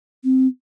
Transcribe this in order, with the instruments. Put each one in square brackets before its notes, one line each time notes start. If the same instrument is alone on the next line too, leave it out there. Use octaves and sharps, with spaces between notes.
[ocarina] C4